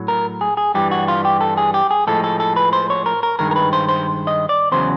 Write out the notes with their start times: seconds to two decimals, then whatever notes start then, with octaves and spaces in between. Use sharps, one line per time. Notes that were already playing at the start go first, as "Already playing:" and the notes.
Already playing: A2 F#3
0.08 A#4
0.41 G#4
0.57 G#4
0.74 G2 E3 G3 G4
0.91 F#4
1.08 F4
1.25 G4
1.41 A4
1.57 G#4
1.74 G4
1.91 G#4
2.07 A2 F3 G#3 A4
2.24 A4
2.40 A4
2.56 B4
2.73 C5
2.90 C#5
3.06 A#4
3.23 A#4
3.39 G2 D#3 G#3 A#4
3.51 A#4
3.56 B4
3.73 C5
3.89 C5
4.27 D#5
4.49 D5
4.72 E2 C#3 F#3 C5